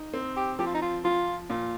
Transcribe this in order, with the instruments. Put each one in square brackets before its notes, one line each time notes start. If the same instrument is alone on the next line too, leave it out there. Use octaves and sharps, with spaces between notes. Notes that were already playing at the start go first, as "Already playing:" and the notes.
Already playing: [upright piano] D#4
C4
[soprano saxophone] G4
[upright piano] F3 [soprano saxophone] G4
[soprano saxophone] F4
D#4
F4
[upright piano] F3 [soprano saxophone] F4
[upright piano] A#2 [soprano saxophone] F4